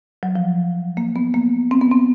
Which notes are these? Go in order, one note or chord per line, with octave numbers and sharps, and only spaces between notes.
F#3
F3
A#3
B3
A#3
C4
B3
C4